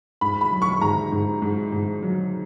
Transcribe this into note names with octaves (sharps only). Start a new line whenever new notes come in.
G#2 B5
B5
F#3
C#6
G#2 A#5
G#2
G#2
G#2
F#3